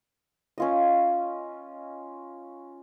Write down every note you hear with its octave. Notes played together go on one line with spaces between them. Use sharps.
C#4 F4 D#5